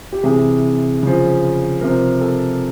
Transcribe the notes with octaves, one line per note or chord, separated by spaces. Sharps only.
G4
C3 E3 G#4
C#3 F3
C3 F3 A#4
A4